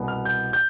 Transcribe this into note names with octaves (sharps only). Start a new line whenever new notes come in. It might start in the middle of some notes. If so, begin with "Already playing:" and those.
Already playing: C2 B2 B3
F6
G6
G6